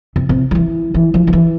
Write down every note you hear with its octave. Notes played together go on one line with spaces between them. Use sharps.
C3
C3
F3
E3
E3
F3
F3
E3